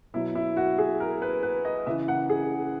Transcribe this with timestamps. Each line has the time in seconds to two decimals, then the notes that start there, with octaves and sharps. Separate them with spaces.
0.14 B2 F#3 E4
0.35 E4
0.57 F#4
0.78 G#4
1.00 A#4
1.22 B4
1.43 B4
1.65 D#5
1.87 C#3 E3 E5
2.08 F#5
2.29 G#4